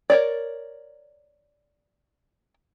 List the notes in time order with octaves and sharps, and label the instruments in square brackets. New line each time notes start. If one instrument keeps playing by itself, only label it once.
[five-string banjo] A#4 C#5 D5